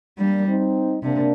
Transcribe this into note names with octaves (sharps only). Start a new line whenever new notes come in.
G3 A#3 D4
C4 D#4
C3 A#3 D4